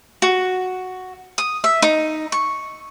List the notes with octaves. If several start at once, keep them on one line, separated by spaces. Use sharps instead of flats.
F#4
D#6
E5
D#4
C#6